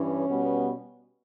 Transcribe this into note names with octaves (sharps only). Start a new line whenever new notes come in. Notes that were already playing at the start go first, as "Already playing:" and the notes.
Already playing: G2 E3 C#4
B2 G3 B3